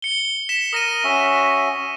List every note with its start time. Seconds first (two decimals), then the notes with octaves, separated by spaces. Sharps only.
0.02 C#7 G7
0.49 B6 E7
0.73 A#4 D#6 A#6 D#7
1.04 C#4 F#4 E5